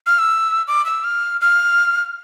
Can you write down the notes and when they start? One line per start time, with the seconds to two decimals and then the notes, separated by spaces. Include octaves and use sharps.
0.06 F6
0.19 E6
0.67 D6
0.86 E6
1.04 F6
1.41 F6